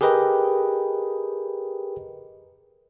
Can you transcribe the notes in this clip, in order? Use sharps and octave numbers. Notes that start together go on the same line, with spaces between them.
G4 G#4 A#4 B4 D#5 G5